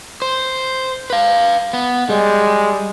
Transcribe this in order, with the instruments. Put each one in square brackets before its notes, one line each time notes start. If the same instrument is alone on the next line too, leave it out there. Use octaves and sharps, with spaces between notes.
[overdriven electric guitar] C5
B4 F5
B3
[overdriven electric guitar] G3 [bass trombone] G#3